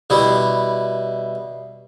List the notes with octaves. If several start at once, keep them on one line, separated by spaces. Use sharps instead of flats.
B2 G3 E4